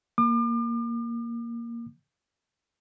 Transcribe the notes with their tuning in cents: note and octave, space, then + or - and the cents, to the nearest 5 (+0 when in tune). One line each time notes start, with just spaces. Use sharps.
A#3 +0 D6 +40